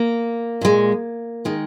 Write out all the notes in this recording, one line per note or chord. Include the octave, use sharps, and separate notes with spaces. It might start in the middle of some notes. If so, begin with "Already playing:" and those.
Already playing: A#3
A#2 G#3
D#3 G#3